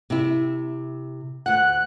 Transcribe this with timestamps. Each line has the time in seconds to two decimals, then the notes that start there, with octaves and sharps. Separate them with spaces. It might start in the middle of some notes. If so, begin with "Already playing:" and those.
0.10 C3 E4
1.46 D2 F#5 F#6